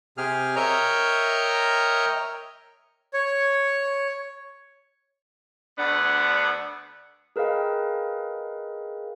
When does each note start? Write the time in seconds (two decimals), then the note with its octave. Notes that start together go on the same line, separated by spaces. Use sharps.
0.17 C3 G4 G#4 F6
0.56 A#4 C#5 D#5 E5 G5 A#5
3.14 C#5
5.78 D2 B3 D4 F#5
7.36 G#4 A#4 B4 D#5 F5 G5